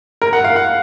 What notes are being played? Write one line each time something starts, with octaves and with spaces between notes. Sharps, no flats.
A#4
F#5
F5
F#5